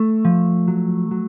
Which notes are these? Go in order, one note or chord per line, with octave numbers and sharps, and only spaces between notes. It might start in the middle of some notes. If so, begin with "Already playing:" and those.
Already playing: A3
F3
F#3
F#3